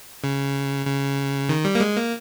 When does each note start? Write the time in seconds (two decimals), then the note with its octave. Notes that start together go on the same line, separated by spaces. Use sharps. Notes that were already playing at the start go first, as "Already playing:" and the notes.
0.24 C#3
0.87 C#3
1.49 D#3
1.65 G3
1.75 A#3
1.80 G#3
1.97 A#3